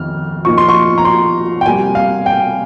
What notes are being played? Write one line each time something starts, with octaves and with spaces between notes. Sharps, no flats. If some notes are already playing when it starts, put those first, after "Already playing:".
Already playing: F2 D#3 F6
A#2 F3 A#3 D#4 C#6
C6
C#6
A#5
C6
G5
C3 G3 A#3 G#5
F5
G5